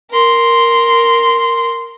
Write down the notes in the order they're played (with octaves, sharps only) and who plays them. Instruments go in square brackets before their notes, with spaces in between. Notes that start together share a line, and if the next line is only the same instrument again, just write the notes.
[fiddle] A#4 C6